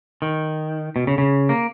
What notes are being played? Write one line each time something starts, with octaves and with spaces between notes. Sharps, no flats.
D#3
B2
C#3
C#3
A#3